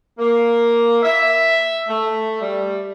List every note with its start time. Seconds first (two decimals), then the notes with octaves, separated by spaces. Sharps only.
0.18 A#3
1.03 E5
1.87 A3
2.40 G3